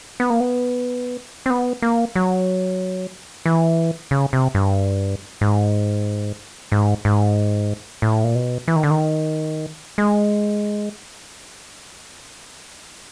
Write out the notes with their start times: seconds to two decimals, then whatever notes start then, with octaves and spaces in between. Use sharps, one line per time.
0.20 B3
0.30 A#3
0.40 B3
1.46 C4
1.50 B3
1.82 A#3
2.16 F#3
3.46 E3
4.11 C#3
4.33 C3
4.55 G2
5.41 G#2
6.72 G#2
7.05 G#2
8.02 A2
8.24 A#2
8.35 B2
8.68 E3
8.76 D#3
8.83 D3
8.91 D#3
9.98 G#3